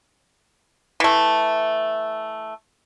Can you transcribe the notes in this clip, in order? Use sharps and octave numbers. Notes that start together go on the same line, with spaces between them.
E3 A3